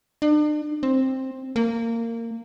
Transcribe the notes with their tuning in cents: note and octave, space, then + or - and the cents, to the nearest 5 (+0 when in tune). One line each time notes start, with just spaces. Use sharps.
D4 +40
C4 +10
A#3 -20